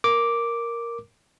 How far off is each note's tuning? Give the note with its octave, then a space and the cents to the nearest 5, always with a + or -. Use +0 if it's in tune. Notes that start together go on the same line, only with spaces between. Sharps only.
A#4 +0 D6 -5